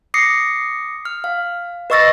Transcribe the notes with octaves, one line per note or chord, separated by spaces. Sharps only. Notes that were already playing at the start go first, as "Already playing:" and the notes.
D6 D#6 A#6 C7 C#7
F6
F5
B4 D#5 C#6 E6 A6 A#6